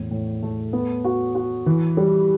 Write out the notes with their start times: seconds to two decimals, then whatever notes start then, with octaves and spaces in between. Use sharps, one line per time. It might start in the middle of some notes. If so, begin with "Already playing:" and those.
Already playing: E2 A2
0.11 A2
0.43 A3
0.73 B3
1.04 F#4
1.35 F#4
1.66 E3
1.97 G3